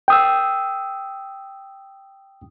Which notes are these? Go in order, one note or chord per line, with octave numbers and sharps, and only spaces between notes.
G5 D#6 E6